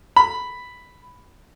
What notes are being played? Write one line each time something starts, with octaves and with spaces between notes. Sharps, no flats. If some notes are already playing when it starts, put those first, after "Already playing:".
B5